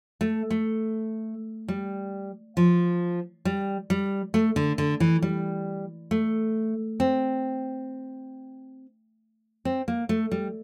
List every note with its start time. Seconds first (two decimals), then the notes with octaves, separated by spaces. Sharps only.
0.21 A3
0.50 A3
1.68 G3
2.57 F3
3.45 G3
3.90 G3
4.34 A3
4.56 D3
4.78 D3
5.00 E3
5.23 G3
6.11 A3
7.00 C4
9.65 C4
9.88 A#3
10.09 A3
10.32 G3